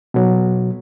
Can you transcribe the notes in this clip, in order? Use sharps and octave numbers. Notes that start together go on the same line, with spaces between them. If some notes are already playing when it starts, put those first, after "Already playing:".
B2 F#3